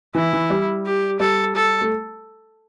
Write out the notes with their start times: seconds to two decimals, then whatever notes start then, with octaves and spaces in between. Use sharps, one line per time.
0.15 E3 E4
0.33 E3
0.50 G3
0.86 G4
1.20 G3 A4
1.56 A4
1.81 A3